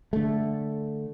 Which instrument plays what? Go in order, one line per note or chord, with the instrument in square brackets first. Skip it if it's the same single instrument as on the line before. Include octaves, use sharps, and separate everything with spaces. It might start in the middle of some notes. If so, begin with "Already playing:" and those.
[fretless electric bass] D3 A3